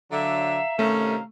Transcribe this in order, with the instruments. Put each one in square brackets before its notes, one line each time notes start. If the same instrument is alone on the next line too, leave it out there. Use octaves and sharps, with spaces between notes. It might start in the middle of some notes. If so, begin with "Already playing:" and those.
[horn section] D3 F#3 [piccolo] E5 [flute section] F5 A#5
[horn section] C3 D#3 C#4 [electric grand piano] A3 [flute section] F5 A#5 F6